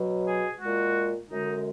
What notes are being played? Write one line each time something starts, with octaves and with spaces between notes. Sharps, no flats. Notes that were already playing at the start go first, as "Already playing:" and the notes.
Already playing: B2 F#3
G#4
A#2 G#3 F#4
F#2 D3 G#3 D#4